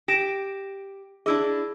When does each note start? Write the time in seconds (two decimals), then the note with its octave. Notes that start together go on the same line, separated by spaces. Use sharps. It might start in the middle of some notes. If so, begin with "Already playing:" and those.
0.08 G4 A#6 D7 E7
1.26 D4 E4 G#4 D#5 E6